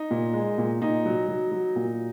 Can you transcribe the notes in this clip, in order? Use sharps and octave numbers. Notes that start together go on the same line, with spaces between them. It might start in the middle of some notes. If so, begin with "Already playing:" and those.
Already playing: D#4
A#2
G#3
A#2
A#2 D#4
F#3
F#3
F#3
A#2